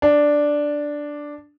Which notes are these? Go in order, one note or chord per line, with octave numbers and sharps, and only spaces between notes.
D4